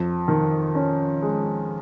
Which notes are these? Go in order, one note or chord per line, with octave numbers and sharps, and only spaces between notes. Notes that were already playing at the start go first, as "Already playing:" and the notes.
Already playing: F2
D#3
C#4
G#3